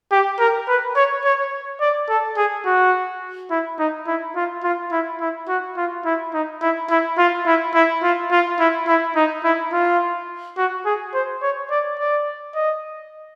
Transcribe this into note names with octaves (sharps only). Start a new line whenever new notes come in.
G4
A#4
B4
C#5
C#5
D5
A4
G#4
F#4
E4
D#4
E4
F4
F4
E4
E4
F#4
F4
E4
D#4
E4
E4
F4
E4
E4
F4
F4
E4
E4
D#4
E4
F4
F#4
G#4
C5
C#5
D5
D5
D#5